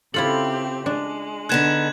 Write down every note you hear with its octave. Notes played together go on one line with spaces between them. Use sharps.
C#3 C4 E4 F4 G4 A4 F#7
G#3 D4
D3 B3 D#4 F#6 G#6 E7